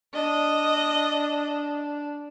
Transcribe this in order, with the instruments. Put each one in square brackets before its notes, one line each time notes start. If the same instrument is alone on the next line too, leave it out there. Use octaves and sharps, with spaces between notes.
[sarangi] D4 [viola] D#5